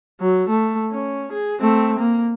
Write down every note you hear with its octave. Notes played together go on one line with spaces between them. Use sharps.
F#3
A3
C#4
G#4
A3 C4
A#3